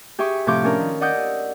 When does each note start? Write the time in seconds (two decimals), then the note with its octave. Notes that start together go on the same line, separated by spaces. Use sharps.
0.19 G4 G#4 E5 C#6
0.47 A2 C3 F3 C#6 D6 G6
0.64 C#4 D4 A#4
0.80 D#3
1.01 D5 D#5 F#5 D#6 E6 G6